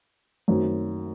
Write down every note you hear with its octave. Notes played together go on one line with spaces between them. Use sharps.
F#2 D#3 A3 C4